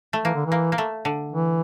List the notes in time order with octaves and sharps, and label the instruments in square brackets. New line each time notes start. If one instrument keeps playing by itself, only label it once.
[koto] A3
[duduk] E3 [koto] A#3
[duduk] D3
E3
[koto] A#3
A#3
A3
D3
[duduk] E3